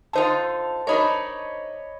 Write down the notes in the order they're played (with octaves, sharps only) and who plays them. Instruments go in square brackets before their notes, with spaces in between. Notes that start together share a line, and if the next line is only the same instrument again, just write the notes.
[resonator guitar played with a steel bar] D3 D#4 F4 [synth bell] C5 A5
[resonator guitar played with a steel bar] D4 D#4 A#4 [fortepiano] C#5 D#5 B5